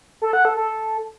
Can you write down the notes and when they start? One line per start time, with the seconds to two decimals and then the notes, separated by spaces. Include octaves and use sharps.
0.22 A4
0.33 F#5
0.45 A4
0.57 A4